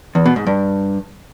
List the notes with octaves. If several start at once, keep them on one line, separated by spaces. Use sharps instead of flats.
E2
B2
G#2
G2